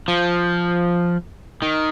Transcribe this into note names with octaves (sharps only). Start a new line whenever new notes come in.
F3
D#3